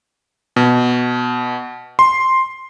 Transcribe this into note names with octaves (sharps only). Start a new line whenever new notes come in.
B2
C6